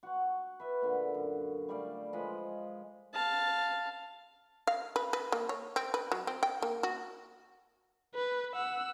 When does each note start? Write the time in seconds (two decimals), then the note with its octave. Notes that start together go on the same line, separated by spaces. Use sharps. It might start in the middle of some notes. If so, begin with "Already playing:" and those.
0.03 F#4 F#5 C#6
0.60 B4 E5
0.82 A#2 D3
1.14 F#2
1.69 G3 A3 D5 F5
2.13 F3 G#3 D#5 B5
3.14 F5 A5
4.67 F5
4.96 B4
5.13 B4
5.32 A#3
5.49 C#5
5.76 C4
5.94 B4
6.12 F#3
6.27 C4
6.43 G5
6.62 A#3
6.83 F#4
8.15 B4
8.55 F#5 E6